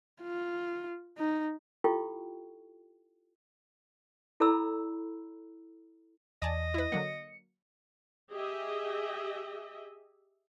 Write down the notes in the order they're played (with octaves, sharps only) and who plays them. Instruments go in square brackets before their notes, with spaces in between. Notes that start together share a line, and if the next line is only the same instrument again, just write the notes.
[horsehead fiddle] F4
D#4
[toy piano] E4 F4 G4 A4 G5 C#6
E4 A4 D5 A#5 B5 E6
[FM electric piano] E2 [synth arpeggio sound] D5 G#5 A5 [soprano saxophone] D#5
[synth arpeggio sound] E4 B4
[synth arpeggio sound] D3 F#3 A#3 [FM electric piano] C#7
[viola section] G4 G#4 D#5 E5